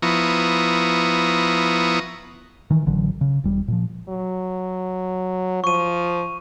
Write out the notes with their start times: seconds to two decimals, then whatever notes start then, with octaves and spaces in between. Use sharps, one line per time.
0.02 F3 B3 E4 A#5 C#6 D#6
2.70 D#3 E3
2.86 A1 D3 E3 F#3
3.21 C#3
3.44 E1 G3
3.68 A#2 F3
4.09 F#3
5.64 F3 C#6 D#7